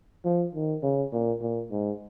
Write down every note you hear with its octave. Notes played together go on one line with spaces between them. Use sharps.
F3
D#3
C#3
A#2
A#2
G#2